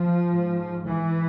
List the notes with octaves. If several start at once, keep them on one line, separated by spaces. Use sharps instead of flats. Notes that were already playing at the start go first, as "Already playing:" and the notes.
Already playing: F3
G#2
E3